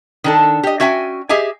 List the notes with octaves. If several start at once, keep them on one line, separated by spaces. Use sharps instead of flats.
D#3 D4 A4
G4 D#5
C#4 F#4 E5 G5 G#5
G4 G#4 D#5 E5 G#5